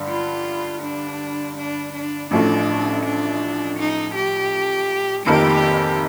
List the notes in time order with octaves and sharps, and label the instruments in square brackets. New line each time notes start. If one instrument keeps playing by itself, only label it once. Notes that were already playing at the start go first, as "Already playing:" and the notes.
Already playing: [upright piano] G2 D3 G3
[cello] F4
D4
D4
D4
[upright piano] A1 A2 F3 A3 [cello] D4
[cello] D4
D#4
G4
[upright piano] F1 F2 D#3 A#3 [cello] G4